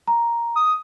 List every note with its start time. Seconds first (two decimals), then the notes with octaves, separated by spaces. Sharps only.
0.08 A#5
0.56 D#6